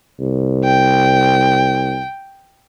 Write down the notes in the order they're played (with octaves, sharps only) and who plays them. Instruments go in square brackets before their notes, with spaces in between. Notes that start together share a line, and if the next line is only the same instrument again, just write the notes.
[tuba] C2
[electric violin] G5